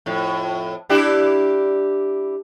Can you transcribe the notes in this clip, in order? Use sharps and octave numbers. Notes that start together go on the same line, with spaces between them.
F2 A2
D4 E4 G4